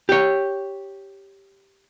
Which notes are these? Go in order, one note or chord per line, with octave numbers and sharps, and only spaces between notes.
G4 C#5